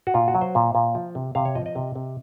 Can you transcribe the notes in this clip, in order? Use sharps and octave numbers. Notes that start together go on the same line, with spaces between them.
F#4
A#2 F4
F#4
F#3
C5
A#2
A#2
F3
C3
C3 F5
C#5
F3 D#5
D#5
C3
C3